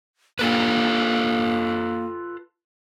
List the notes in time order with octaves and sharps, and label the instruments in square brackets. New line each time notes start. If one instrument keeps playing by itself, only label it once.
[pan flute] A#3 [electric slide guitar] F4 A4 B4